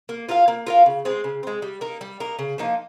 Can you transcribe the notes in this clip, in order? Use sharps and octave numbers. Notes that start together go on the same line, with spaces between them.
A#3
F4 A#4 F5
A#3
F4 A#4 F5
C#3
G#3 C4
C#3
G#3 C4
G3
A#3 D#4 A#4
G3
A#3 D#4 A#4
C#3
F3 A#3 D#4